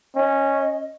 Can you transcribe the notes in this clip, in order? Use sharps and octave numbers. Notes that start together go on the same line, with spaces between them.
C#4 D#5